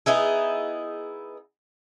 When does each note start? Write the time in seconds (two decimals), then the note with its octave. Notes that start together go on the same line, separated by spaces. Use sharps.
0.06 B3 D#4 E4 G#4